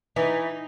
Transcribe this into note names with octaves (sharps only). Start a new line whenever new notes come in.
E3 D#4